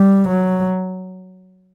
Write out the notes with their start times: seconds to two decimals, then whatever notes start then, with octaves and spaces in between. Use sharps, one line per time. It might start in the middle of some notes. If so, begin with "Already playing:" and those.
Already playing: G3
0.29 F#3